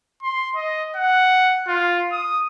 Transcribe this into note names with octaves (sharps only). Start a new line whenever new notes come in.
C6
D#5
F#5
F4
D#6